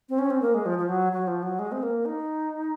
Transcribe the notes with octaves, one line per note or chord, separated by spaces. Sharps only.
C4
C#4
C4
A#3
G#3
F3
F3
F#3
F#3
F3
F#3
G#3
C4
A#3
D#4